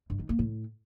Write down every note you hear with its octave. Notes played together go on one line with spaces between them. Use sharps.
G2
D#3
A#3
A2